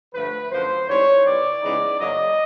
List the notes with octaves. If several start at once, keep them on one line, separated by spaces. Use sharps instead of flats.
G2 D3 F3 A3 B4
F#2 D3 F3 A3 C5
G#2 E3 G3 C4 C#5
C3 E3 G3 D5
C#3 E3 G#3 B3 D#4
F#2 C#3 F#3 A#3 D#5